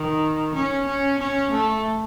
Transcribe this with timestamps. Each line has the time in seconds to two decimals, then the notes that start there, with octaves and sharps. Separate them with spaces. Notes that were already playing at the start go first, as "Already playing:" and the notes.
Already playing: D#3
0.55 C#4
0.87 C#4
1.19 C#4
1.51 A3